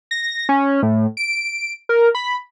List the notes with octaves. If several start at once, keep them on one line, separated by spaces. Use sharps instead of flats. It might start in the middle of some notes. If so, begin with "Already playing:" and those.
A#6
C#4
A2
D7
A#4
B5